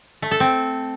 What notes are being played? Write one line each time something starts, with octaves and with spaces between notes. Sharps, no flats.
A3
A4
C4